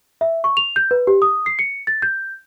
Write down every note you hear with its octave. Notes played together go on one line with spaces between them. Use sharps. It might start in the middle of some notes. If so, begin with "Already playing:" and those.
E5
C#6
F7
G6
B4
G4
D#6
C7
C#7
A6
G6